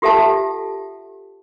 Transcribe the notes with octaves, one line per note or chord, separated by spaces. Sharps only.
F4 G4 A4 E5 F#5 A5